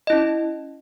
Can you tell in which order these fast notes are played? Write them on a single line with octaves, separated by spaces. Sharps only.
D#5 E4 C#4